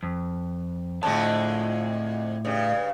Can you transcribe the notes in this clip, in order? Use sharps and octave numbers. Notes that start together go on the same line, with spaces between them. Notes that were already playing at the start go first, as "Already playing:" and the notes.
F2
F2 A2 D3 G#3 A5
G2 C#3